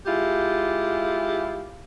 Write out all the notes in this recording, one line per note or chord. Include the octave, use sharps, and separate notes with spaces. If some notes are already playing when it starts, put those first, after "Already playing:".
G#3 E4 F4 G4